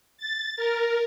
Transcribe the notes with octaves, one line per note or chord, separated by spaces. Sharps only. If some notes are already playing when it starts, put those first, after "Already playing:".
A6
A#4